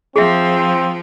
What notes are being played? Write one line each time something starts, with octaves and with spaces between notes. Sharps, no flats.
F3 C4 G#4 E5